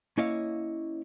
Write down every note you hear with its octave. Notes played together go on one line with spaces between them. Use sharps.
A#3 C#4 E4 C#5 D#5 F5